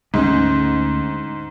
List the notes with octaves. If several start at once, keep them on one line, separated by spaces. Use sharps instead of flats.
D2 G#2 G#3 C#4